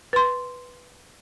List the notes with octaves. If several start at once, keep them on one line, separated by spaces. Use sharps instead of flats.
B4 C6